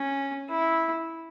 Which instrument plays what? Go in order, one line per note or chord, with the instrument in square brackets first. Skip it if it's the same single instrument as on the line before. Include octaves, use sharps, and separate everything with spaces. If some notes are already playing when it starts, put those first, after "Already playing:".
Already playing: [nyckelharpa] C#4
E4